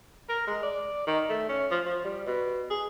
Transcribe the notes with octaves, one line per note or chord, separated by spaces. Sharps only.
A#4
G#3
D5
D#3
A3
C#4
F3
F3
G3
B2
G#4